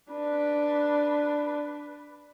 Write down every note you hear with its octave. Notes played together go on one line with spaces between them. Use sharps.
D4 B4